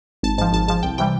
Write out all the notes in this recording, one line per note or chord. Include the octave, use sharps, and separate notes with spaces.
G#1 A5
G#2 F3 A5
G#1 A5
G#2 F3 A5
C2 G5
C3 E3 G3 G5